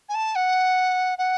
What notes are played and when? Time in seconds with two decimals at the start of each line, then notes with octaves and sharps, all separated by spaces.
0.09 G#5
0.14 A5
0.35 F#5
1.18 F#5